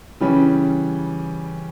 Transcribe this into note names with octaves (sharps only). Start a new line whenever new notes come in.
C#3 E3 G3 C#4